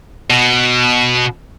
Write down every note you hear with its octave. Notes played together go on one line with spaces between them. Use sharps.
B2